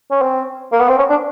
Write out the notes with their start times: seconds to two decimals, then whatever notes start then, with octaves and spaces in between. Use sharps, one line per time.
0.11 C#4
0.22 C4
0.72 A#3
0.80 B3
0.89 C4
0.99 C#4
1.10 D4